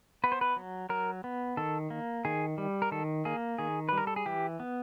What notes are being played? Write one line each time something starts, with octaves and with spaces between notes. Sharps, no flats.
B3 B4
C5
B4
F#3
F#3 A#4
B3
D#3 A4
A#3
D#3 G#4
G3
A#4
D#3 A4
A#3 G#4
D#3 G#4
G3 B4
A#4
A4
G#4
E3 G4
B3